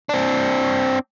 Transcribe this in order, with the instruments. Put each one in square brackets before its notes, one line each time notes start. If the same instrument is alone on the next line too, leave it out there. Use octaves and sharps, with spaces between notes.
[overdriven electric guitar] C4 D4